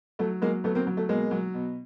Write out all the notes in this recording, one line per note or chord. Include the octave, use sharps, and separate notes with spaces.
F#3 A3
F#3 G#3 A#3
F#3 A3 B3
A#3 C4
F#3
A3
B2 G#3 A#3
F#3
B2